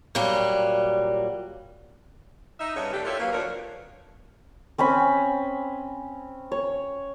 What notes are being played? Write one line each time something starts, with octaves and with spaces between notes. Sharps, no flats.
A#2 F#3 G3
D#4 E5
G2 C#3 G3 B3 D#4 C#5
A3 D4 G4
E4 F4 G4 A4 A#4 C#5
F#3 A#3 C#4 E4 B4 F5
D2 F3 A#3 D4 A#4 C#5
C4 C#4 G#5 B5
C#5